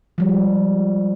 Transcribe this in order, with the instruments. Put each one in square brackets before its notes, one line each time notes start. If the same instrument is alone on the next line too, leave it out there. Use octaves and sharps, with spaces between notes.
[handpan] F3 G3 G#3